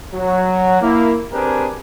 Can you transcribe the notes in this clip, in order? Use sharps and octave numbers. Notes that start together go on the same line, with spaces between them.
F#3
A#3 E4
C4 D4 G4 G#4 A#4 B4